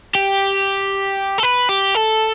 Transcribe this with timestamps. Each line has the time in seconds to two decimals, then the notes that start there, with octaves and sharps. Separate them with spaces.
0.15 G4
1.38 A4
1.43 B4
1.69 G4
1.95 A4